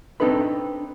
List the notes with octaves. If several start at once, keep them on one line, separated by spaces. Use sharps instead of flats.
C4 D4 D#4 A4 B4 B5